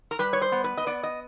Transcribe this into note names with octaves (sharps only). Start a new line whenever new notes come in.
A#4
G3 B4
C#5
C5
B3
B4
D#5
B3 D5
D#5